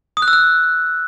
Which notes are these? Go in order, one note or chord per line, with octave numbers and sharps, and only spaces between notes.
D#6
F#6
E6
F#6